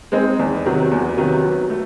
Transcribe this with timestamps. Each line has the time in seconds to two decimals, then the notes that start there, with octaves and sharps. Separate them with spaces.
0.12 G#3 C4 D#4
0.39 E2
0.65 C3 D#3 F#3 B3
0.91 E2
1.17 C3 D#3 F#3 B3
1.44 F#3
1.70 A3